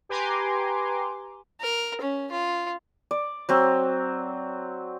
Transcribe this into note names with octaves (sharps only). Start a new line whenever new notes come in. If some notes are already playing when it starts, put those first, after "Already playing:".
G4 B4 G#5 A#5 C6 D6
A#4
C#4
F4
D5
F#3 C4